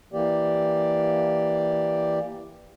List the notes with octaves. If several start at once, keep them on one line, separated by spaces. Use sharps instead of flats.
E3 A#3 G4 D5